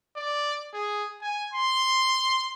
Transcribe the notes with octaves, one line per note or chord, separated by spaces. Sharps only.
D5
G#4
G#5
C6